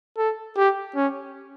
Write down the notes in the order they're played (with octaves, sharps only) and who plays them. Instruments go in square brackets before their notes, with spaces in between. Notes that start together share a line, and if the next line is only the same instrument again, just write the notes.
[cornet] A4
G4
C#4